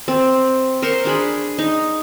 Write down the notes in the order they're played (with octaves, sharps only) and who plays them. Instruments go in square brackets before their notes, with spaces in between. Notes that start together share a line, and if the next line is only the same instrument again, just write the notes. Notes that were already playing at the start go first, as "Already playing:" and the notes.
[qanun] C4
A#4 C5 C6 C#6
D4 G#4 B5
D#4